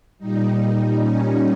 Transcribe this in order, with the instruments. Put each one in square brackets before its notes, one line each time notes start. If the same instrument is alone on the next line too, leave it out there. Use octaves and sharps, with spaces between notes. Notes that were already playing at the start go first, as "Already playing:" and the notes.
[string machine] A#2 G3 D#4
C#4